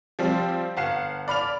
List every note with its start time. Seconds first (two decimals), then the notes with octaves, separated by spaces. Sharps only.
0.19 F3 G3 C4
0.77 G1 F5 F#5 C7 E7
1.28 D5 B5 F6 F7